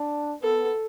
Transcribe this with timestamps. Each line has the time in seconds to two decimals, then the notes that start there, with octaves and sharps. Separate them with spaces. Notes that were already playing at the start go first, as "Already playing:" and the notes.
Already playing: D4
0.42 B3 A4